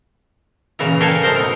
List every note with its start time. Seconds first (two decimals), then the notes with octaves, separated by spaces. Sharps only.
0.79 A#2 C#3 E3 E5 A#5
1.00 A4 A#4 E5 F5 G5 G#5
1.21 A3 A#4 C5 D#5 F5
1.36 B2 D#4 A#4